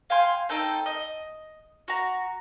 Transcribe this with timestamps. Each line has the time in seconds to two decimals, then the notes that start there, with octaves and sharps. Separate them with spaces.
0.10 F5 G5 G#5 C6
0.49 C4 D#4 A4 G5
0.86 D#5
1.88 F#4 A#5